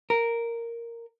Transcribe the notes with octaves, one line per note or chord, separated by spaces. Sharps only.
A#4